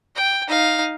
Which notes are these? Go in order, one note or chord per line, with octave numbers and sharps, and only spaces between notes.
G5
D#4 F5